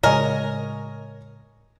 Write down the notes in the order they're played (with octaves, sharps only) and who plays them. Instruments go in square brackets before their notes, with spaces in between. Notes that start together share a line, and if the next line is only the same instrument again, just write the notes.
[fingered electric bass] A2 C#3 G#3 [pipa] A#4 [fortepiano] C#5 D#5 G#5